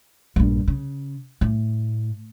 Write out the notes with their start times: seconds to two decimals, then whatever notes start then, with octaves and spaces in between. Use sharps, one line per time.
0.36 A#1 G2
0.68 C#3
1.41 A2